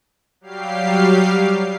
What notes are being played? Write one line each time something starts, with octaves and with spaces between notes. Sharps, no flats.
F#3 G3 G4 F5 C7